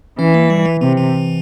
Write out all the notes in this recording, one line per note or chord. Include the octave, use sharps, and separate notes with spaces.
E3 C#4
A#3
G3
E3
C3 E3
E3